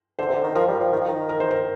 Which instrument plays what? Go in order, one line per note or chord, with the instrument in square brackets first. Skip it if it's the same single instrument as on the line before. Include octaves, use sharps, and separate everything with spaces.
[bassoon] D3 [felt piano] C5
[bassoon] C3
D3
D#3
[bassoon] F3 [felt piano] A#4
[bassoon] G3
F3
D#3
F3
D#3
[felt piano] A#4
C5
A#4